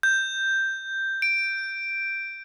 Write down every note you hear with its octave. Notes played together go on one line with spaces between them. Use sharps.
G6
D7